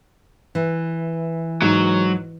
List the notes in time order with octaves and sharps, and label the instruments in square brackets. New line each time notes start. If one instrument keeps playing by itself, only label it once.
[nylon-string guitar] E3
[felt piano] G#2 [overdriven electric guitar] F#3